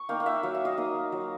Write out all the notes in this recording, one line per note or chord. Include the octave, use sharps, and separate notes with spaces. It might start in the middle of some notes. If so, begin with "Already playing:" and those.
Already playing: C#6
A#3 D#4 F5 G5
F5
E5 F#5
F#3 F5
E5
D#5 F5
A#3 D#4
F#3